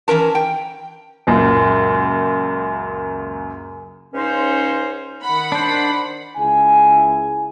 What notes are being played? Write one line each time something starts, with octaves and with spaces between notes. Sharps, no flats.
E3 C#4 A#4 A5
G5
C#2 F#2 A#2
C#2 C#3 C#4 D#4 C5
D#3 F#5 B5
D4 C5
C#2 E4 G#4 G#5